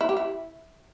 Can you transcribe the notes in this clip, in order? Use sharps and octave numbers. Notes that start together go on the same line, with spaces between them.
E4
G4
E4